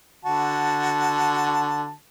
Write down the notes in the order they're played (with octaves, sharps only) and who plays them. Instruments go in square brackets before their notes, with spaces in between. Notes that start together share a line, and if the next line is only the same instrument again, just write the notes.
[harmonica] D3 F#4 A5